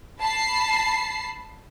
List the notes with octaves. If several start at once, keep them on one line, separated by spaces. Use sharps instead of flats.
A5 B5 C7